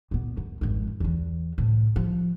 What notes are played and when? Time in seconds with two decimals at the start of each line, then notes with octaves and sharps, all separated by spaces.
0.11 A#2 B3
0.37 F#2
0.61 G#1 F2
1.00 E2 E3
1.58 A2 C3
1.96 F3